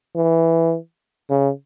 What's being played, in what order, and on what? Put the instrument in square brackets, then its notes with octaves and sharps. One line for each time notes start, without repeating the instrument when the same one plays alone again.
[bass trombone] E3
C#3